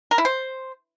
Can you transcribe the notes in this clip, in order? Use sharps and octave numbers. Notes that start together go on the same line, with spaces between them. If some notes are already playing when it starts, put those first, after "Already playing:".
A#4
E4
C5